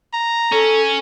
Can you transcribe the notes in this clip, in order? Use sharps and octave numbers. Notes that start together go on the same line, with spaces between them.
A#5
C#4 A4